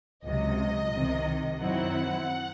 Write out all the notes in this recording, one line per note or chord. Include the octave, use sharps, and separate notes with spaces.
C#2 C3 F#3 D#5
C2 C3 D#3
F#2 D#3 F#3 C4 E4 F#5